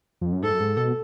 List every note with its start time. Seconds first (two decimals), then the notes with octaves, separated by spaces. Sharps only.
0.21 F2
0.33 F#2
0.43 G#2 A4
0.53 F#2
0.60 G#2
0.77 B2